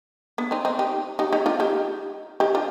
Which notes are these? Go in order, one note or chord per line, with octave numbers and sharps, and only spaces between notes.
B3 D4
C4 D#4
C4 D#4
D#4 G4
D#4 G4
D#4 G4
D4 F4
D#4 G4
D#4 G4
D4 F4